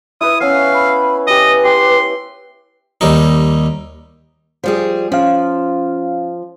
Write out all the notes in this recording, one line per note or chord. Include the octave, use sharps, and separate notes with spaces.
E4 B4 E5 D#6
B3 C#4 F5
B5
G4 B4 D#5 G#5
G4 C6
D#2 G3 D#4
F3 G3 G#4
F3 C#4 F5